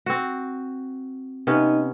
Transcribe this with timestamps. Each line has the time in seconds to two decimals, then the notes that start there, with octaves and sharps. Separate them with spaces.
0.06 C4 F#4
1.47 C3 B3 C#4 D#4 D#5